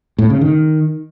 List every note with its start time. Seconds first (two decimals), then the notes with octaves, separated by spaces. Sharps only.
0.18 A2
0.30 C#3
0.41 D#3